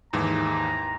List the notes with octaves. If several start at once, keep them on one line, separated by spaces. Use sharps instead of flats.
D#2 G#2 E3 A#5